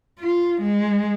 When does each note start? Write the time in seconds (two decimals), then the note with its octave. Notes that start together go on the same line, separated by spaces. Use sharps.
0.20 F4
0.62 G#3